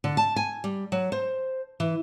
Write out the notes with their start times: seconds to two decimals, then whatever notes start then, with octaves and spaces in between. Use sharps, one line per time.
0.04 D3
0.17 A5
0.36 G#5
0.64 G3
0.92 F#3
1.12 C5
1.80 E3